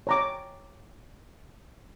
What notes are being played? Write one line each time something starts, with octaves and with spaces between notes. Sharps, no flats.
C#5 A#5 D6